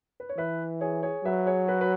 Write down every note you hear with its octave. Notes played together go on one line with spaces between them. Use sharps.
B4
C#5
E3 B4 E5
G#4 C#5
G#4 C#5
F#3 B4 E5
G#4 C#5
F#4 B4
B4